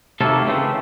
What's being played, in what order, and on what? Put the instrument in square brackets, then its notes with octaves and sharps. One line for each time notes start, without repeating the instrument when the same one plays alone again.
[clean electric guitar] D#2 C3 A3 A#3 A4
C#3 E3 A3 C4